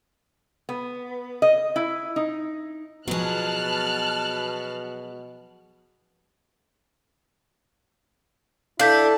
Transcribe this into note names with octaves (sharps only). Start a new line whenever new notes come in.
B3
D#5
E4
D#4
B2 F3 F#3 B3 G#4 A5 F6 F#6
D4 E4 A4 F5 G6 B6